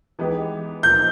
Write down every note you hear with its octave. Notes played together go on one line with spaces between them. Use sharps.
E3 G#3 B3 D#4 G4
A#2 F3 A#3 D#4 G6